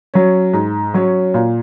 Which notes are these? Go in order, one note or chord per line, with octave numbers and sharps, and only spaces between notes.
F#3 C#4
G#2
F#3 C#4
A#2